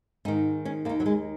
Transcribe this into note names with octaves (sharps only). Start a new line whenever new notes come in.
G#2 D#3 D#4
C#4
D#2 D#3 A#3
F#3
G#3